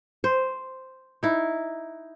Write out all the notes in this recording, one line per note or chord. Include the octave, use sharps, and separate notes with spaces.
C5
D#4 E4